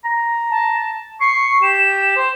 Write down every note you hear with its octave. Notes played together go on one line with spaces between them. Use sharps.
A#5
A5
C#6 C7
G4 E7
C5